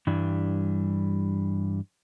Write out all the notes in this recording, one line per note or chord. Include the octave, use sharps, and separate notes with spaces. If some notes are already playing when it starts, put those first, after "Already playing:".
G2 E3 G3 D4